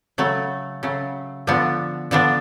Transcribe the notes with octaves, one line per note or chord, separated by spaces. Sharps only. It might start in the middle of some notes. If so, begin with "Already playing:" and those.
C#3 F#3 A3
C#3 F#3 A3
D3 F3 B3 D4
D3 F3 B3 D4